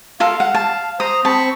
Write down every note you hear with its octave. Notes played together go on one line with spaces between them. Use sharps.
F4 A4 A#4 F5
F#5
A5
C5 A#5 D#6
C4 A5 B5 C#6